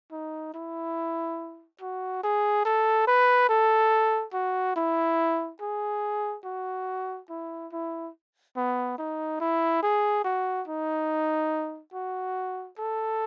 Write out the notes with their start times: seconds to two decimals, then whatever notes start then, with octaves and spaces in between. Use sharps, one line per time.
0.12 D#4
0.54 E4
1.81 F#4
2.23 G#4
2.65 A4
3.07 B4
3.49 A4
4.33 F#4
4.76 E4
5.61 G#4
6.44 F#4
7.29 E4
7.72 E4
8.56 B3
8.98 D#4
9.40 E4
9.83 G#4
10.24 F#4
10.68 D#4
11.94 F#4
12.78 A4